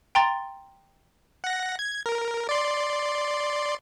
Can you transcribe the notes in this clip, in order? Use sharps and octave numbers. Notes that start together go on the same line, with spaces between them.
G5 A#5 C6 A6
F#5 A#6
G#6
A#4
D5 C6